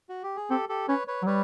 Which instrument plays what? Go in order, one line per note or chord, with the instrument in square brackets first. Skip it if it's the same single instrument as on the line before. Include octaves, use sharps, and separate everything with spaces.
[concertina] F#4
G4
G#4
[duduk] C4 [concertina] G4 A4
[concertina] G4 A4
[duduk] C#4 [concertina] B4 C#5
[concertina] B4 C#5
[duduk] F#3
[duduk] G3 [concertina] B4 C#5